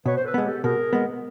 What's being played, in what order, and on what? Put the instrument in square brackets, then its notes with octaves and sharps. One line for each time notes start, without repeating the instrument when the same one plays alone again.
[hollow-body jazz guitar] B2 [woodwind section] B4 C#5
[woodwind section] C5
A4 B4
[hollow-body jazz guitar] G#3 B3
[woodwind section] G4 A4
[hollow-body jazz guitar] B2 [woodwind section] G#4 A#4
[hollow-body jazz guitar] G#3 B3